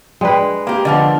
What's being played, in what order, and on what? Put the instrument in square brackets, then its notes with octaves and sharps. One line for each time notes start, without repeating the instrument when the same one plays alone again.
[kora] G#3 B4 [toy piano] D4 D5 G5
[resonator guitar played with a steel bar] A#3 G4 [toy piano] F5 A#5
[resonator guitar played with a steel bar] D3 F3 B3 [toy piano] D#5